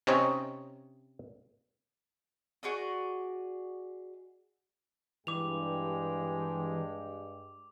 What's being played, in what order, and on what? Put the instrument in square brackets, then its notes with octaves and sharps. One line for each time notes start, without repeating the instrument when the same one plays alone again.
[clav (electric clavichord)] C3 C4 C#4 D#4 C#5 D#5
[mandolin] F#4 G#4 D5 D#5
[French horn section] G2 [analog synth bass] E3 [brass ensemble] G#3 G4 G5 [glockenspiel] D6 F7